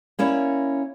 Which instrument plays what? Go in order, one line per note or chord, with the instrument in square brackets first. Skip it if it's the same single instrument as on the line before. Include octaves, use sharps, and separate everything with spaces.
[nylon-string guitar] A#3 C#4 E4 D5